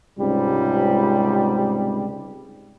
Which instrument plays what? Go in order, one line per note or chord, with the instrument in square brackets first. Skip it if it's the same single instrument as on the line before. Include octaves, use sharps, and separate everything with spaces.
[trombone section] C#2 G#2 C3 G3